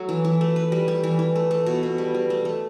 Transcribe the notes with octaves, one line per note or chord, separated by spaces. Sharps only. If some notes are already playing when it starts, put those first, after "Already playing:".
Already playing: F#3 A3
E3
E3
A3
B4
G3
G3
E3
E3
A3
A3
B2
B2
G3
G3
A3
A3